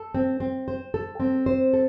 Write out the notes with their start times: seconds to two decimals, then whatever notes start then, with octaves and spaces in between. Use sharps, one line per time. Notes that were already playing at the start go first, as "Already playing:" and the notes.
Already playing: A4
0.15 C4
0.40 C4
0.68 C5
0.94 A4
1.20 C4
1.46 C5
1.73 A4